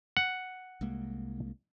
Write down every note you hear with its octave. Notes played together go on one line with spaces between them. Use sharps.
F#5
C2 G#3 A#3